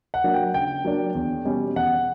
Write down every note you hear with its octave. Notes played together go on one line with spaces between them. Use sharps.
F#5
F#3 A#3 D4
G5
C#3 G5
F#3 A#3 D4
E2
B2 G3 C#4
E2 F#5